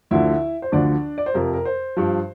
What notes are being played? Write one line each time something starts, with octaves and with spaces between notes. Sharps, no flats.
D2 D3 F3 E4 E5
C5
D2 D3 F3 D4 D5
D5
C5
F2 C3 F3 A#4
A#4
C5
G2 F3